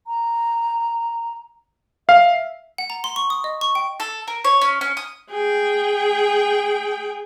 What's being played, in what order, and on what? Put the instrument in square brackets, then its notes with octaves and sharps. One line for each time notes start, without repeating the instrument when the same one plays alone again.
[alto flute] A#5
[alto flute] E5 [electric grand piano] F5
[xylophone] F#5
A#5
C6
C#6
D#6
D#5
C#6
G5
[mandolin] A4
A#4
C#5
C#4
C#4
D#6
[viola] G#4 G5